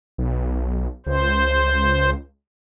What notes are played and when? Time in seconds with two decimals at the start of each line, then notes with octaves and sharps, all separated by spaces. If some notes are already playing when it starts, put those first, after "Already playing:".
0.18 B1
1.06 C#2 C5